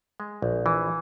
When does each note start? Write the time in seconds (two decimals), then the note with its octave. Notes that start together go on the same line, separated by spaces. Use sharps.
0.20 G#3
0.42 A#1
0.66 E3